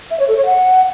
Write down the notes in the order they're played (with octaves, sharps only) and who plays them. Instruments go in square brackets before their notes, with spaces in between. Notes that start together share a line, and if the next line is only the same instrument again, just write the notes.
[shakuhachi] E5
C#5
A4
C#5
F#5